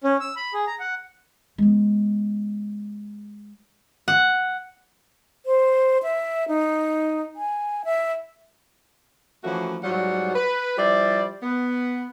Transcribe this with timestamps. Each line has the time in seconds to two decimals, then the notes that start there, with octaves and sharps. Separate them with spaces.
0.04 C#4
0.20 E6
0.36 B5
0.54 G#4
0.67 A#5
0.80 F#5
1.58 G#3 B3
4.08 F#5
5.46 C5
6.03 E5
6.48 D#4
7.36 G#5
7.85 E5
9.44 E3 F3 A3 A#3 C#4 F#4
9.84 G#2 F#3 G3 F4 C#5 F#5
10.35 B4
10.78 F3 G3 E4 C5 D5
11.43 B3